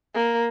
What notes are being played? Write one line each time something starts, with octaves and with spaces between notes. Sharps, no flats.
A#3